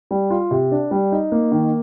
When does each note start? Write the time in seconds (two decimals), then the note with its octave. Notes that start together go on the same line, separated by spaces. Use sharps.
0.11 G3
0.30 F4
0.51 C3
0.72 D4
0.91 G3
1.12 D#4
1.32 A#3
1.52 D#3